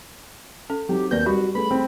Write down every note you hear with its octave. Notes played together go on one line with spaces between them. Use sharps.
C#4 A4
F#3 C4 D#4 G4
D#2 B4 D5 G6
G3 F#4 G4 B5
A3 C#4 G#4 B4 B5
C4